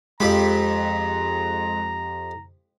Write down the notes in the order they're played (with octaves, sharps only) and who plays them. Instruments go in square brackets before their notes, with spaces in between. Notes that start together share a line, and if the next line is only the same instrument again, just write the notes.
[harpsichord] F2 G4 B5 [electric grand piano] G#3 [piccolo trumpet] A#5